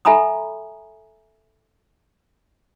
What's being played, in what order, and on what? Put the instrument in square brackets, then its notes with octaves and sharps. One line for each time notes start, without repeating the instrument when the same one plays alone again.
[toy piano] A4 E5 G#5 A#5 B5 D#6